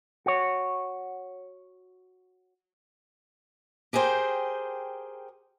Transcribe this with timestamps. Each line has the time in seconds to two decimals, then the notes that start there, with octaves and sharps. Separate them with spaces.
0.26 F#4 C#5
3.93 G4 G#4 A#4 C5 G5